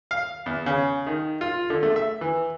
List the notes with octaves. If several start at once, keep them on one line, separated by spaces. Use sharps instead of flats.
F5
E2
C#3
D#3
F4
D3
A3
E5
E3